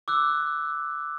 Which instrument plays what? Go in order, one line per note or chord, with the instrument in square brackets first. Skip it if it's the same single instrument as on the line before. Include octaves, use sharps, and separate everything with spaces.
[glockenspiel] D6 E6 F#6